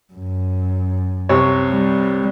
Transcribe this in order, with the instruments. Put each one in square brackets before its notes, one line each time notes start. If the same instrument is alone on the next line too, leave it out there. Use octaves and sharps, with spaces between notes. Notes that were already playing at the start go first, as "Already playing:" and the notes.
[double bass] F#2
[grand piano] C2 C3 C#5
[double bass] G3